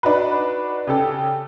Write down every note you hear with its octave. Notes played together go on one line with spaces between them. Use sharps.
D4 D#4 F#4 B4
C#3 G4 A4